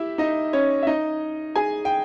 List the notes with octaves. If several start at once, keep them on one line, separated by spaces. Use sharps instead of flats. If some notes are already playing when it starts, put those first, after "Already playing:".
Already playing: E4 G4 E5
D#4 D#5
C#4 C#5
E5
D#4 D#5
G#4 G#5
G5